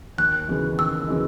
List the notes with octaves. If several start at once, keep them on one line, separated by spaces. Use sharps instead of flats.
D#2 F#6
C#3 E3 G#3
D#2 E6
C#3 E3 G#3